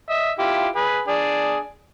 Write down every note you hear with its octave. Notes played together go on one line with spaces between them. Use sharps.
D#5 E5
E4 F4 G4
G#4 B4
D4 G#4